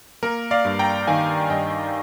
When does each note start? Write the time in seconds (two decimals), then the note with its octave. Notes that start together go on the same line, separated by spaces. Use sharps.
0.23 A#3 A#4
0.51 D5 F5
0.65 G2
0.79 G5 A#5
1.07 D#3 F5 G#5
1.50 G2 D#5 G5